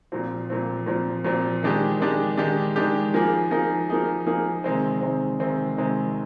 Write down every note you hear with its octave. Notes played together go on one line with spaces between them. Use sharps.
A#2 F3 C4
A#2 F3 C4
A#2 F3 C4
A#2 F3 C4
D#3 G#3 D4 G4
D#3 G#3 D4 G4
D#3 G#3 D4 G4
D#3 G#3 D4 G4
F3 A#3 D#4 G#4
F3 A#3 D#4 G#4
F3 A#3 D#4 G#4
F3 A#3 D#4 G#4
C3 D#3 G#3 C4
C3 D#3 G#3 C4
C3 D#3 G#3 C4
C3 D#3 G#3 C4